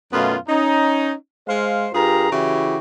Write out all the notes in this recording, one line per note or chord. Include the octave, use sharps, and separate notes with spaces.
F#2 B2 A3 B3 F4
C#4 D#4
G#3 C5 F5
G2 F4 G4 G#4 A#4 A#5
C#3 E3 E4 F#4 G4